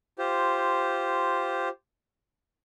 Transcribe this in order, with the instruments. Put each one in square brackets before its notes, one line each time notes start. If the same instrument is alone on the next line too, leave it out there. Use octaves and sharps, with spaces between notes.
[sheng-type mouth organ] F4 G4 C5